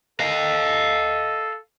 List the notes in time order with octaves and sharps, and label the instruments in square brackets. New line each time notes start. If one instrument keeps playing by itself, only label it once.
[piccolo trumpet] A4 [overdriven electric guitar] D#5 F5